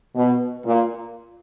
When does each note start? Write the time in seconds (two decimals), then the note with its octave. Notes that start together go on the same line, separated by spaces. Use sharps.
0.16 B2
0.66 A#2